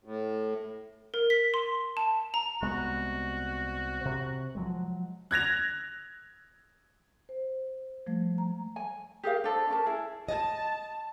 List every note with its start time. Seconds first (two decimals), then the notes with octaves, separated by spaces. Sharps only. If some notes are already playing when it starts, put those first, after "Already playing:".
0.04 A2
1.14 A#4
1.30 B6
1.54 C6
1.97 A5
2.34 A#5
2.62 C2 G#3 B3 F#4
4.05 C3
4.55 F3 F#3 G#3
5.31 F#6 G#6 A#6 F7
7.29 C5
8.07 F3 G3 A3
8.38 A#5
8.76 G#5
9.23 G4 G#4 A#4 F5
9.44 D4 A4 C5
9.70 C#4 A#4 A5
9.86 E4 G#4
10.29 D#5 A5